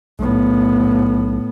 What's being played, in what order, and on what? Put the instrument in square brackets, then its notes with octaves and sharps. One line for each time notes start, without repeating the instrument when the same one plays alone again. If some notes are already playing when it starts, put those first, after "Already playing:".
[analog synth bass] B1 [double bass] A2 B3